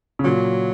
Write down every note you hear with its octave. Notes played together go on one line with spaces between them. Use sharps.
C#3
A#2 F#3